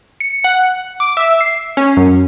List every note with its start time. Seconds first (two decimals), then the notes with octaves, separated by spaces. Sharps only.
0.20 C#7
0.44 F#5
1.00 D6
1.17 E5
1.41 C7
1.77 C#4
1.97 F#2